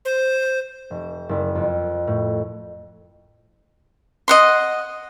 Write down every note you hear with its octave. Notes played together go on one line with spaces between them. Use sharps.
C5
F1
F#1
F2
A2
D#5 F#5 C6